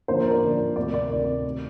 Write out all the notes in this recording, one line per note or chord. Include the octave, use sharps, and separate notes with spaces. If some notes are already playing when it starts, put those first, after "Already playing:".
D#2 D3 F3 C5
A#4
D5
D#2 D3 F3
D2 C3 D#3 D5
D5
D2 C3 D#3
D#3